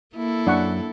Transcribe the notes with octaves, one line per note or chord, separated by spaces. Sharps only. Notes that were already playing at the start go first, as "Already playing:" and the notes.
A#3 E4 A4
F#2 D4 F#5 C#6